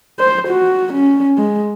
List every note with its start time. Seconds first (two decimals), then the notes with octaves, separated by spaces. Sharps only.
0.19 C5
0.48 F#4
0.93 C#4
1.38 G#3